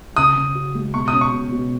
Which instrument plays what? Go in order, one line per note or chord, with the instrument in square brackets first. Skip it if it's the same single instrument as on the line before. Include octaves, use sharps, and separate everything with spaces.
[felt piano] C#3 [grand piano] D#6
[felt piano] C#3
F#4
G#3
[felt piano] B2 [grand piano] C#6
[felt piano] C#4 [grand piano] D#6
[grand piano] C#6
[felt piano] B2
B2